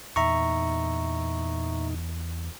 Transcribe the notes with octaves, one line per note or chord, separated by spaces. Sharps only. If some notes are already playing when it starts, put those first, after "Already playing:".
E2 A#2 D#4 E5 A#5 C#6